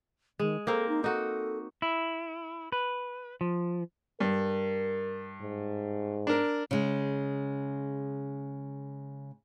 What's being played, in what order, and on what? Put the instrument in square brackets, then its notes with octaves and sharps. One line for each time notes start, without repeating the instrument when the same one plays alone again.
[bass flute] D#3 [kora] G#3
[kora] A#3 C4 A#4 [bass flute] A4
[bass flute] D#4
[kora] D#4 F#4 [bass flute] A4
[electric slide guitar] E4
B4
F3
[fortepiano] G2 [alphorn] A#4
[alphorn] G#2
[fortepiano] D4 A#4
[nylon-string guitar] C#3 G#3